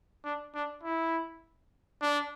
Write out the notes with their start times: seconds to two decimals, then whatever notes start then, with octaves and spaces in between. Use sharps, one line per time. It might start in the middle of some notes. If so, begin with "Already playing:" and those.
0.25 D4
0.55 D4
0.83 E4
2.02 D4